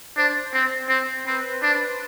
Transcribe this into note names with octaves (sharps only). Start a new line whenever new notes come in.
D4 C5
C4
C4
C4 B4
D4